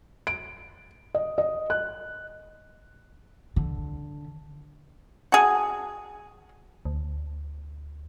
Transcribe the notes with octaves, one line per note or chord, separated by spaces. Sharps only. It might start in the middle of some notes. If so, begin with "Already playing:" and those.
D7
D#5
D#5
F#6
D3
F#4 G#4
D2